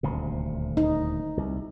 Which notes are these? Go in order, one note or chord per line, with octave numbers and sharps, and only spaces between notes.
D#1 D2 C3
D#4
C2